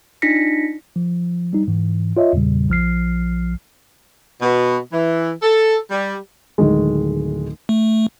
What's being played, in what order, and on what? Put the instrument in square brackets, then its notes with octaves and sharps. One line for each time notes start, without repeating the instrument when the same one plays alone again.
[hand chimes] D4 D#4 F4 A#6 B6 C#7
[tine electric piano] F3
G3 D#4
G#2 E3
F4 C#5 D#5 E5
E2 A#2 C#3 G3
A#1 F3 F6 C7
[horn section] B2
E3
A4
G3
[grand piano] D1 D#3 G#3
[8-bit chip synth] A3